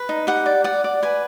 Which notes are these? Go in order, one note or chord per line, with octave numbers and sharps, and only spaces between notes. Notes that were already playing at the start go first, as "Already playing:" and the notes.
Already playing: B4
D#4
G4 F#5
D5
D5 F#5
D5
B4 G#5